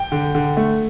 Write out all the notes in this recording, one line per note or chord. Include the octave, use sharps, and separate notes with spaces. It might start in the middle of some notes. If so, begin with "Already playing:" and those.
Already playing: G5
D3
D3
A3